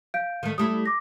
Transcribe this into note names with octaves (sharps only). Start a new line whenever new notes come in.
F5 G6 D7
D#3 A3
G3 A3 E4 D#6
D6 A#6